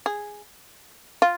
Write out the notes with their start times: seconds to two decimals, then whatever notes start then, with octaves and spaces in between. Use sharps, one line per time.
0.06 G#4
1.22 F4